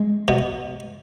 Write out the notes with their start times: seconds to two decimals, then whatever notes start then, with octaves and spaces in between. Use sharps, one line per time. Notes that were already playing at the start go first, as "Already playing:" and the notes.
Already playing: G#3
0.28 B2